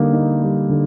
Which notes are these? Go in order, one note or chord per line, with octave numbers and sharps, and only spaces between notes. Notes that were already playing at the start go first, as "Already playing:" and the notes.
Already playing: D3 G3 A#3 D#4
D#4
G3
D3